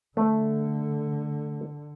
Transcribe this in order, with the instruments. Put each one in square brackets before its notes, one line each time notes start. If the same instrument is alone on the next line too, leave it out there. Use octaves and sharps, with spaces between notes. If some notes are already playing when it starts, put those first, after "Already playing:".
[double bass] D3 [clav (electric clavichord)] A3